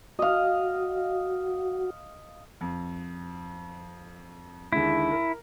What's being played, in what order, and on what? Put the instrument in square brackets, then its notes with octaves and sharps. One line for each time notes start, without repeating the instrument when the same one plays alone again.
[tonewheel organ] F#4 [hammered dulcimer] D#5 F5
[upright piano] F2
[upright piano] D#2 D3 G#3 [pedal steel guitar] E4
[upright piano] A#4